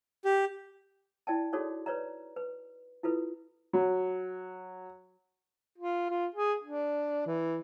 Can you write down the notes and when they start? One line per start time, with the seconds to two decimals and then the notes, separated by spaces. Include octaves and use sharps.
0.25 G4
1.27 E4 D5 G5 A5
1.53 D#4 F#4 G#4 A4 C#5 D5
1.86 B4 C#5 D5 A#5
2.36 B4
3.03 E4 F4 A4 B4
3.73 F#3
5.78 F4
6.10 F4
6.35 G#4
6.64 D4
7.27 E3